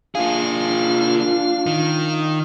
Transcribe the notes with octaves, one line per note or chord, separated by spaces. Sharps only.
A#3 D4 F4 G#4 F5
D#3